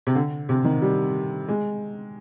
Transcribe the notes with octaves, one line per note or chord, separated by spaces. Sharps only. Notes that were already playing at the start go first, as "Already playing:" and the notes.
C3
D3
C3
D#3
G3
G#3